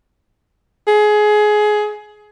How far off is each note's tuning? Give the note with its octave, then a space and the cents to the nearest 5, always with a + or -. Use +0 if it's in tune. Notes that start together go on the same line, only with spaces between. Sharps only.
G#4 +20